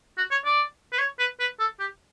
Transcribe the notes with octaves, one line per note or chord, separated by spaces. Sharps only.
F#4
C#5
D5
B4
C#5
B4
B4
A4
G4